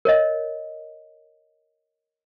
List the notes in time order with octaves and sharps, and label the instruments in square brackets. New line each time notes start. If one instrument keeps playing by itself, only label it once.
[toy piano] A#4 C#5 D#5